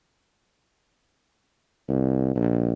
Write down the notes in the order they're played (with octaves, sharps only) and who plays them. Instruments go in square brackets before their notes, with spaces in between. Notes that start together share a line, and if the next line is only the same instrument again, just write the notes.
[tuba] C2
A#1